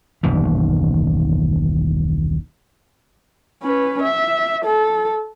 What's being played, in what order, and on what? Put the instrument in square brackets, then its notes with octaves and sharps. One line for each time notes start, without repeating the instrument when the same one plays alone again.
[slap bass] D#1 B1 F#2 E3
[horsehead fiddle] C#4 B4
E5
A4